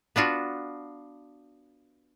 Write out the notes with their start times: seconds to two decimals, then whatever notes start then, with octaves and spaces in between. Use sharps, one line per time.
0.16 B3 D4 F4 F#4